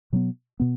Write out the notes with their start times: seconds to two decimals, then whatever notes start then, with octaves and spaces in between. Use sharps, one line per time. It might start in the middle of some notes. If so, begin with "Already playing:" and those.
0.13 B2 F#3 B3
0.60 B2 B3